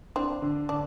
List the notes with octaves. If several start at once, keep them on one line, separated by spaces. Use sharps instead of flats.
C4 D4
D3
D3 D4